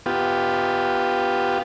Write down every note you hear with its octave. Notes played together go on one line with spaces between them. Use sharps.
B3 F4 G4